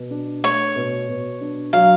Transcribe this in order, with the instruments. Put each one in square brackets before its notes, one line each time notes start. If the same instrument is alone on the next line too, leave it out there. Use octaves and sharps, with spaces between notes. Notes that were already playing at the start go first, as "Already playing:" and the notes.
Already playing: [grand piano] B2
D4
[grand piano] A3 [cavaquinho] C#5
[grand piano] B2
B2
D4
[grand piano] F#3 [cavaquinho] F5